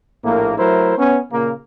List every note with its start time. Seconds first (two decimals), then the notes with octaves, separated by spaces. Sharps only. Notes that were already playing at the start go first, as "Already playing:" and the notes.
0.24 A#1 A2 A#3
0.58 F#3 A3 E4 A#4 C5
0.98 B3 C#4
1.31 A#2 C#3 A#3